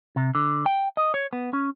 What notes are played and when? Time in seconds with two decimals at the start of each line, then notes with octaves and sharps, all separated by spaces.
0.16 C3
0.35 D3
0.66 G5
0.97 D#5
1.14 C#5
1.33 B3
1.53 C#4